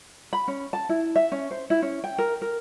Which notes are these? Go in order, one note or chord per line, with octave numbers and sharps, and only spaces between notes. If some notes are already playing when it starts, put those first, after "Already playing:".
B5
C#4
A5
E4
E5
C#4
C5
E4
C#4
G5
A#4
A#4